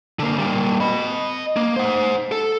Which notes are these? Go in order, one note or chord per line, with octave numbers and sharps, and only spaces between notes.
D3 A#3
G3 A#3
D#5 B5
A#3
C5 F#5
A4